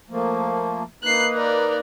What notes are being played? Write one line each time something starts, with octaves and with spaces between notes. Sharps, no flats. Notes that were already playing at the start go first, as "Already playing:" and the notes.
F3 A3 A#3
A#3 D#4 B4 F#6 C7
A#4 D5